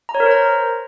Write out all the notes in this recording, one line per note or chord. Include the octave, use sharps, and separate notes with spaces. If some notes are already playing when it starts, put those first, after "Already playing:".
A#5
C#5
A#4
C5
A#5